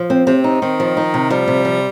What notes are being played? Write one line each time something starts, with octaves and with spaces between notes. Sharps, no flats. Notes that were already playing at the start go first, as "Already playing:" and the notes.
Already playing: F3
C4
C3 C4
D#4
D#3 C4
F3
D#4
C3
F3 G3
C3
F3